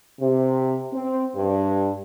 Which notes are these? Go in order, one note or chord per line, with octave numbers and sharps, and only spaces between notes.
C3
C4
G2